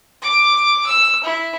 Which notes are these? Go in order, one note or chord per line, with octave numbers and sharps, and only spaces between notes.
D6
E6
E4